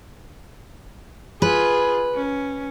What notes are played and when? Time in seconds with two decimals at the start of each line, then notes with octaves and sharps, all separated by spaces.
1.42 F4 G#4 B4
2.15 C#4